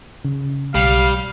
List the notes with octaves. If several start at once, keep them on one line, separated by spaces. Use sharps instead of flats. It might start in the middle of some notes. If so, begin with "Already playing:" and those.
C#3
B1 G3 F5